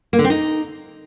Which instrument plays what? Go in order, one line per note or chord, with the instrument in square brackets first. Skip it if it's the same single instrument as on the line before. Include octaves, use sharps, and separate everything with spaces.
[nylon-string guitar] A#3
D3
C4
D#4